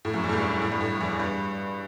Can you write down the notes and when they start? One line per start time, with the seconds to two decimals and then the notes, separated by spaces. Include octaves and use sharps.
0.05 A2
0.14 F#2
0.24 E2
0.29 A2
0.33 G2
0.62 A2
0.72 G2
0.81 A2
1.01 E2
1.20 G2